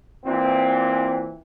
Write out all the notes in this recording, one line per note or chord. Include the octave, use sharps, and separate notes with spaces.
A#2 E3 C4